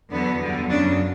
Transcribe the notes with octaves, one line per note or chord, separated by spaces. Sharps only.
E2 D3 F#3 B3
E2 D3 G3
F#2 C#3 F#3 D4